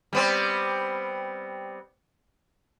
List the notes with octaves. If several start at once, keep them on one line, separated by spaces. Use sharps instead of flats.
G3 B3 C4